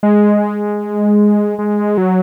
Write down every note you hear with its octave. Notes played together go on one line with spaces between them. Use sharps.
G#3
G#3
F#3